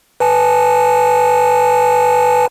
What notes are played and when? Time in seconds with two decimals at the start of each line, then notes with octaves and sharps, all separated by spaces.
0.20 B4 G#5 A5